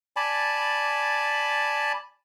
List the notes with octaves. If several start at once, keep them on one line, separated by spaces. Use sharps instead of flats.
D5 G#5 A5 B5